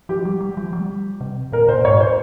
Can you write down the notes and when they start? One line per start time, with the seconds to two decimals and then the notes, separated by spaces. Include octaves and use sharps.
0.09 F3 G4
0.25 G3
0.41 G3
0.57 F3
0.73 G3
1.21 C3
1.52 A#2 A#4
1.69 A#2 C5
1.85 G#2 C#5
2.01 C5